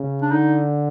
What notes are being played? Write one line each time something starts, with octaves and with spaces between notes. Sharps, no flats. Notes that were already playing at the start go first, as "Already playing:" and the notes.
Already playing: C#3
D4
D3 D#4